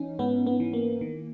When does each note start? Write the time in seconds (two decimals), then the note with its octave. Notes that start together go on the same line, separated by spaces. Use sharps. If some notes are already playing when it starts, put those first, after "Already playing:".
Already playing: E3 C#4 D#4
0.19 G#2 B3
0.47 B3
0.60 E3
0.73 A#3
1.01 D#3